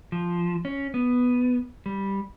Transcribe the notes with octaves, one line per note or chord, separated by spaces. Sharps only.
F3
C#4
B3
G3